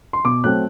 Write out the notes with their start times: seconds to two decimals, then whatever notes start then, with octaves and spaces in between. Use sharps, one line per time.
0.13 C6
0.25 B2 D6
0.44 F#3 A3 C4 F#6